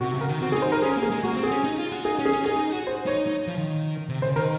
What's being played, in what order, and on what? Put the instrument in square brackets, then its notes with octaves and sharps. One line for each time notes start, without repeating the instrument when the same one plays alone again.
[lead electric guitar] C3 [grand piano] F#4
[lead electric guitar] C#3
[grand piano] A#4
[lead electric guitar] D#3
[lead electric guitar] C4 [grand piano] F#4
[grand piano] G#4
[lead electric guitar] D#4
[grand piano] C5
[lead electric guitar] D#4 [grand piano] A#4
[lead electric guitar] C#4 [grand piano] G#4
[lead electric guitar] A#3
[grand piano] G#4
[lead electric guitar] G#3
[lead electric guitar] A#3 [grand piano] F#4
[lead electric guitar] C4
[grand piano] G#4
[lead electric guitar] C#4
D#4
F4
F#4
[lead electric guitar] D#4 [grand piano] G#4
[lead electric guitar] C#4
[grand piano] G#4
[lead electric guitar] C#4
[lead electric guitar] D#4 [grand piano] G#4
[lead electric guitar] D#4
F#4
[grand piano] C5
[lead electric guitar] D#4 [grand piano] C#5
[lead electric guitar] D#4
F3
D#3
C3
[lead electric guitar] C#3 [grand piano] C5
[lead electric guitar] D#3 [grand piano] A#4